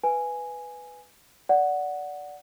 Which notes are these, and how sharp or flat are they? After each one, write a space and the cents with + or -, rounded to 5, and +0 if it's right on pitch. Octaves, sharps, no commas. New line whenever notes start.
B4 +0 E5 +45 G#5 +0
D5 -15 F#5 +0